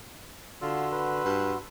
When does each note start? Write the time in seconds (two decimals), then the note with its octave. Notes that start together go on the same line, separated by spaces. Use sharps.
0.62 D3 F4 F#4 C6 E6
0.92 B4
1.25 G2